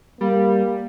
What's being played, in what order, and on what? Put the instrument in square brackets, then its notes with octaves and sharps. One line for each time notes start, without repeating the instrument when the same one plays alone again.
[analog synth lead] G3 [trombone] A#3